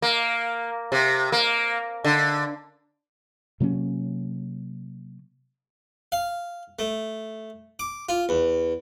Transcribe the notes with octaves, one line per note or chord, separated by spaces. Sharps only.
A#3
C3
A#3
D3
C3 F#3 A#3 C#4
F5
A3
D6
F4
E2